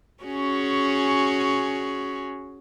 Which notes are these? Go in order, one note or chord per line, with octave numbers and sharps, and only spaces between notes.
C#4 F#4 G#4